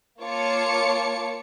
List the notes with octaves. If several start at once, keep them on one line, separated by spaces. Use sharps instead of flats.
A#3 F4 C#5 A5 D6 C#7